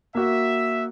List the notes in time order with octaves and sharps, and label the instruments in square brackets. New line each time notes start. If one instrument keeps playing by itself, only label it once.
[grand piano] A#3 F#4 [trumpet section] E5